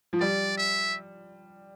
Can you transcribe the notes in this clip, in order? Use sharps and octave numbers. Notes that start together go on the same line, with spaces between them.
F3
G3 D5
E5